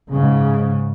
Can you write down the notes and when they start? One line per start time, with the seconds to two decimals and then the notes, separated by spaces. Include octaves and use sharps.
0.12 G#2 C#3